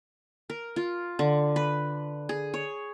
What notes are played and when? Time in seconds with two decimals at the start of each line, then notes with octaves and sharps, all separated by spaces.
0.50 A#4
0.76 F4
1.19 D3
1.56 B4
2.29 G#4
2.54 C#5